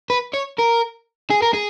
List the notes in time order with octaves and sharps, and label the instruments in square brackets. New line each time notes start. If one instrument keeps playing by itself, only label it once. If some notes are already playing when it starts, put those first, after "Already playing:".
[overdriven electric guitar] B4
C#5
A#4
G#4
A#4
G#4